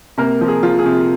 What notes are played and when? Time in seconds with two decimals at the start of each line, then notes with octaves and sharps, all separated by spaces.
0.18 C3 A#3 A#4
0.41 F3
0.48 G#4
0.63 F3 F4
0.79 G#4
0.86 C3